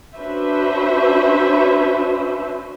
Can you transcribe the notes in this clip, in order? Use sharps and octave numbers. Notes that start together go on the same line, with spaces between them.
C#4 D4 F#4 B4 C5 E5